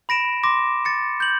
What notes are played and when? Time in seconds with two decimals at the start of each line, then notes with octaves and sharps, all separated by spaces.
0.09 B5 A#6 D7 E7
0.43 C6 D6 A#6
0.85 A6 C#7
1.20 G6 F#7